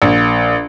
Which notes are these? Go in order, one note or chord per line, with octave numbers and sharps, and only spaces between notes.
A#1